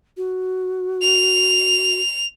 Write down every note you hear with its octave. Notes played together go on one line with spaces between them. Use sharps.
F#4
F7